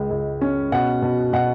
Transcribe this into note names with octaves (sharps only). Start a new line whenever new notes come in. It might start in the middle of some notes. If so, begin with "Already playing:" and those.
Already playing: C#2 G#3
C#2
C#4
B2 F#5
B2
B2 F#5